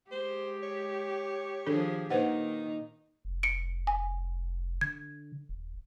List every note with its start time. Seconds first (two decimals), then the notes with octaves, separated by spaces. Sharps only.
0.11 G#3 G4 C5
0.63 C#5
1.66 D#3 F3 D4 G#4 A4
2.10 A#2 D#3 D#4 B4 C5 F#5
3.25 F1
3.43 C#7 D7
3.87 G#5
4.81 D3 G#6
5.49 D#1